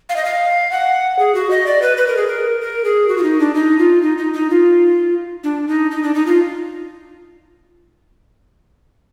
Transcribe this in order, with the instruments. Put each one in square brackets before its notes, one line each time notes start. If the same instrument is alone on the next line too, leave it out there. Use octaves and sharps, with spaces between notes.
[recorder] F5
D#5
F5
F#5
G#4
F#4
D#5
D5
B4
B4
A#4
G#4
A#4
A#4
G#4
F#4
F4
D#4
D4
D#4
F4
D#4
D#4
D#4
F4
D4
D#4
D#4
D4
D#4
F4